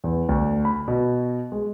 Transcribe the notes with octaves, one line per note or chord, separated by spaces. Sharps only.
E2
D2
B5
B2
G#3